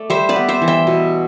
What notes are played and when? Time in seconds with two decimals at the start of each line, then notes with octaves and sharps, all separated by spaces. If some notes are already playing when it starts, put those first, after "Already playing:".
Already playing: A3 D5
0.10 G3 C5 E5
0.29 B4 D5
0.36 B3
0.48 C5 E5
0.62 E3
0.68 E5 G5
0.87 B2